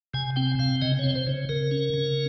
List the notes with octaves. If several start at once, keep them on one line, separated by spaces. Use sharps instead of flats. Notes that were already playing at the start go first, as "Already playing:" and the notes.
C3 G#5
C4 G5
C3 F5
C#3 D#5
C4 C#5
C5
C#3
C#3 A#4
C#4
C#3